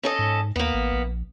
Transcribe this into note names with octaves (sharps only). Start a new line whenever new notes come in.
C#4 A4 D#5
G#2
D#2 A#3 B3
A1
A#1